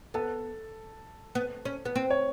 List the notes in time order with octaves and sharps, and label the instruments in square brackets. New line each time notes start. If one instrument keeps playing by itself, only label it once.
[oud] B3 [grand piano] A4
[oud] B3
C#4
B3
C4
[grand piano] C#5